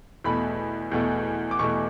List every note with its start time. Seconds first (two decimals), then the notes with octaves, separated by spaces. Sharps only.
0.24 E2 B2 A3 B5
0.91 E2 B2 A3
1.51 D6
1.59 E2 B2 A3 C#6